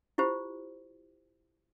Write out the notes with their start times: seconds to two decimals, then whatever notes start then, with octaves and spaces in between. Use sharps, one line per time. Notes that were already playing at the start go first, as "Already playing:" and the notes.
0.18 E4 F4 G4 C5